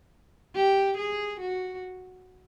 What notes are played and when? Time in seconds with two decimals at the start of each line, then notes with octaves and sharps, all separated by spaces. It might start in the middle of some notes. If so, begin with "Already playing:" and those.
0.55 G4
0.97 G#4
1.40 F#4